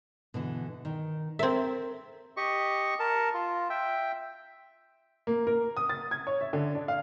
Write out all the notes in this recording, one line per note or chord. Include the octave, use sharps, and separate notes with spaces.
B2 D3 E3
D#3
C4 A4 A#4 E5
G4 D#5 C#6
A#4 A5
F4
E5 G5
A#3
A#4
D#6
A6
G#6
C#5
E5
D3
D4
F5